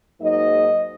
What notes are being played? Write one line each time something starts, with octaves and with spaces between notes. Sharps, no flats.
G#2 F#3 A#3 D#4 D#5